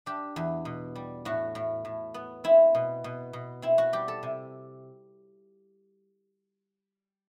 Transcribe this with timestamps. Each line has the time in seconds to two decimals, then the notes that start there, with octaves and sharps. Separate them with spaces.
0.06 D4 G4
0.36 E2
0.65 B2
0.95 G3
1.25 A2 F#4
1.55 A2
1.85 A2
2.14 B3
2.44 C4 E4
2.75 B2
3.04 B2
3.33 B2
3.62 C4 E4
3.78 F#4
3.93 G3 G4
4.08 A4
4.23 C3